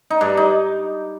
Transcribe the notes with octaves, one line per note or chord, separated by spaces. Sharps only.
D#4
G2 D4
D#4